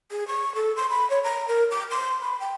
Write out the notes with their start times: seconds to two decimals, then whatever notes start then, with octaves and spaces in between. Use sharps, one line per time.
0.11 G#4
0.28 C#6
0.55 A4
0.76 C6
0.90 B5
1.10 C#5
1.24 A#5
1.48 A#4
1.71 D6
1.91 C6
2.21 B5
2.40 G5